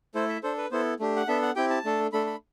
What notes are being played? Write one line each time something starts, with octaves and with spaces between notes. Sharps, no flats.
A3 E4 A4 C5
E5
D4 A4 C5
B4
B3 E4 A4 C5
A3 D4 G4
F#5
B3 D4 A4 E5
F#5
C4 E4 G4 G5
A5
A3 D4 A4
A3 D4 A4 B5
B5